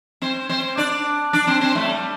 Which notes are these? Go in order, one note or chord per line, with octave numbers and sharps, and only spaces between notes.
C4 C5
C4 C5
D4 D5
D4 D5
C4 C5
C4 C5
A2 A3
G3